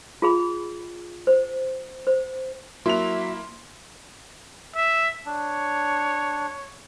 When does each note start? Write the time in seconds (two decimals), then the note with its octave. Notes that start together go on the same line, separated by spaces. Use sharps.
0.22 F4 G#4 B5
1.27 C5
2.07 C5
2.86 F#3 A#3 E4 E5 C6 F7
4.76 E5
5.25 D4 C#5